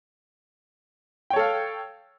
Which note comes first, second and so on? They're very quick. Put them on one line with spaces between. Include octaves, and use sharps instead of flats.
G5 C#5 A4 F5